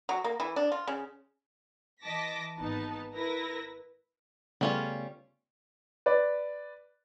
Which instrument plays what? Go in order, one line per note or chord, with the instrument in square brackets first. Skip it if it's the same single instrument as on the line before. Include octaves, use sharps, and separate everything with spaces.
[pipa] F#3
A#3
E3
D4
F4
C#3
[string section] E3 D#5 A5 D6 A#6 B6
G#1 B3 D#4 B4 A5
E4 A#4 B4 A#6
[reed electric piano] C#3 A3 B3 [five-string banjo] G3 C#4 F4
[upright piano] B4 D5